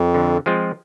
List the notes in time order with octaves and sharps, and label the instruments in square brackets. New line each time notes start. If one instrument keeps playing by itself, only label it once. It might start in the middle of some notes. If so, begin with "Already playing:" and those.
Already playing: [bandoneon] F2
[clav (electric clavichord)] D3
F3 G#3 C4 F4